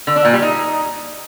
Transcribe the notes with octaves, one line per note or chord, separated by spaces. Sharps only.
D3
D4
A#2
G3
D#4